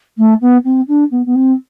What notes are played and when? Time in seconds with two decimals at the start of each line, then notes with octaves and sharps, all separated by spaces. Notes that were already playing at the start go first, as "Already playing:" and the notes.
0.17 A3
0.41 B3
0.64 C4
0.88 D4
1.11 B3
1.26 B3
1.35 C4